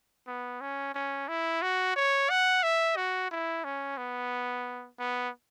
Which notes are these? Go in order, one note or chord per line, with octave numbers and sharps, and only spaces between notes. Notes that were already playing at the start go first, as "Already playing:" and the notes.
B3
C#4
C#4
E4
F#4
C#5
F#5
E5
F#4
E4
C#4
B3
B3